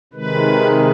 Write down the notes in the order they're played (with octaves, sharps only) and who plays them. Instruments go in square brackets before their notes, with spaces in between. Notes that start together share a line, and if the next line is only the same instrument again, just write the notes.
[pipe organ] C3 D#3 G#3 B4